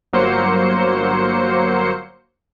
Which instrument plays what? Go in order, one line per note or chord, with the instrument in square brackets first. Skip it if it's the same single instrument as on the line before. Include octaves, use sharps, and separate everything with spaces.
[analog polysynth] G1 F#3 A#3 C5 C#7